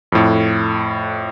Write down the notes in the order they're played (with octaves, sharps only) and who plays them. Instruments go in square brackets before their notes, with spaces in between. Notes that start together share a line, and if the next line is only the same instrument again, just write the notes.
[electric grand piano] F2 A2